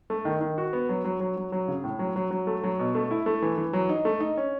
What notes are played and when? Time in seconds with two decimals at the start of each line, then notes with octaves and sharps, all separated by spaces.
0.10 A3
0.25 D#3
0.41 D#3
0.58 F#4
0.73 B3
0.89 F#3
1.05 F#3
1.20 F#3
1.37 F#3
1.52 F#3
1.68 C#3
1.84 A2
1.99 F#3
2.16 F#3
2.31 F#3
2.47 A3
2.63 F#3
2.79 B2
2.95 A3
3.11 E4
3.26 A3
3.42 E3
3.58 E3
3.73 F#3
3.89 D#4
4.05 A3
4.21 D#4
4.37 C#4